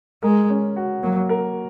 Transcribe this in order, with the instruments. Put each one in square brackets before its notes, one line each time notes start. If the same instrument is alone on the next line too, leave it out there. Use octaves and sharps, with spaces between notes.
[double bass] G#3 [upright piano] A#4
[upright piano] C#4
F#4
[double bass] F#3 [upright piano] A#3
[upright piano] A#4